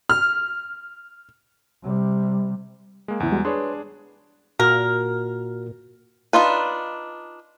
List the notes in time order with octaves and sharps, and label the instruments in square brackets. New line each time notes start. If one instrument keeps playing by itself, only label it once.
[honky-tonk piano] F6
[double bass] C3 G3
[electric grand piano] G#3 A#3
[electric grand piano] E2 [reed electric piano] G#2 C#3 E4
[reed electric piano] G3 G#3 F#4
[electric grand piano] D4 G#4 [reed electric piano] B4 C#5 C6
[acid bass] A#2 [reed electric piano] F#4 F6 [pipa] A#4
[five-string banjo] D4 D#4 F4 B4